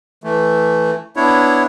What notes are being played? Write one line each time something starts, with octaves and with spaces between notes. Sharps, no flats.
E3 A3
B3 D4 E4 C#5